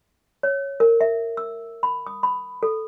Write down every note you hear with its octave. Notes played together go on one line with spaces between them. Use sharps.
C#5
A#4
E5
E6
B5
D#6
B5
A4